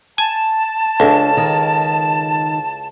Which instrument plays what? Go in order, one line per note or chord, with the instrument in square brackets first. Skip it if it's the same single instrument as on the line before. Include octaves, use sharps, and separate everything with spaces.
[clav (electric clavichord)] G#5 [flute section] A5
[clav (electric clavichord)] C#2 [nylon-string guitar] D4 A4
[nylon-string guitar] D#3